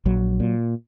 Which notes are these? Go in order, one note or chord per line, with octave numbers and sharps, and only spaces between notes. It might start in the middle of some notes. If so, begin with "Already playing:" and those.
A#1 F#3
A#2